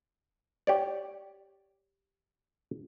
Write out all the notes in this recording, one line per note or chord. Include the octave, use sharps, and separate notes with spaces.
G4 C#5 D5